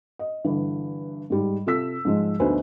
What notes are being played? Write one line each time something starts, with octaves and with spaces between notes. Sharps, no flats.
D#5
G2 D3 E3
G#2 D#3 G3
C3 F4 A4 E6 B6
G#2 F3 G#3
D2 B2 D#4 B4 C5 G#5